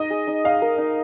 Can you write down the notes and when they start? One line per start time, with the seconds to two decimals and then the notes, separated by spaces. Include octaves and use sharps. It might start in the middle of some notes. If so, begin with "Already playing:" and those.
Already playing: D#4 D#5
0.10 G#4
0.28 D#4
0.45 D#4 F5
0.62 A#4
0.78 D#4